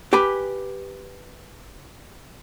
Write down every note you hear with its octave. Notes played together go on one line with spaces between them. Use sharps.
G4 B4 G#5 B5